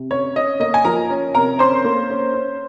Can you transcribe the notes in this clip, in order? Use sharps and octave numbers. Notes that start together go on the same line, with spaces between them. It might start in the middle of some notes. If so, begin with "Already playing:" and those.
Already playing: C3
C#4 C#5
C#4 D#5
A#3 D#5
G#5
F3 A#4 A#5
C#4
C3 A#4 A#5
C#4 C5 C6
A#3
C#4
C#4